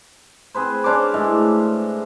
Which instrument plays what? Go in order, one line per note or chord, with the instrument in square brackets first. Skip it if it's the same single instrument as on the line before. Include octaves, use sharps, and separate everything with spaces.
[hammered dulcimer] C4 G#4 B4 C5
C#4 D4 C5 D6
A2 G#3